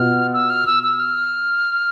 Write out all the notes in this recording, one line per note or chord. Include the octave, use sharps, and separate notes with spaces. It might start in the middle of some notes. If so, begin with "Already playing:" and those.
Already playing: B2 B3 F4 F6
E6
F6
E6
E6
F6